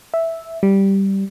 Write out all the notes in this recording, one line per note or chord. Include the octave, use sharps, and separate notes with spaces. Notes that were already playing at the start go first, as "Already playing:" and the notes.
E5
G3